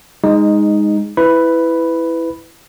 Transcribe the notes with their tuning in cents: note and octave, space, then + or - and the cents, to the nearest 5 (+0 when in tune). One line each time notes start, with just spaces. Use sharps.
G#3 -15 D#4 +0
E4 +0 B4 +15 B5 +0